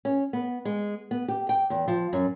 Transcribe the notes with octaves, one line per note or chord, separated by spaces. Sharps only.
C#4
B3
G#3
B3
G4
G5
E2
F3
F#2